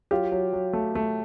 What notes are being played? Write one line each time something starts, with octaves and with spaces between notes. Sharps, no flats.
F#3 F4 G4
F#3
F#3
A3
A3